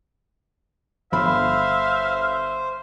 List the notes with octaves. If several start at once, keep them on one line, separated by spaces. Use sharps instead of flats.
G1 C5 E5 F5 B5